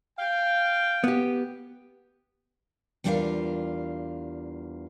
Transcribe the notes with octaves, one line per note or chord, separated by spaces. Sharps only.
F5 G5
B3 G4
E2 G3 D4 F4 A#4 F5